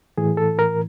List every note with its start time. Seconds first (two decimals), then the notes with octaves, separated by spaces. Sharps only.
0.18 A2 E3 G#4
0.37 A4
0.59 A#4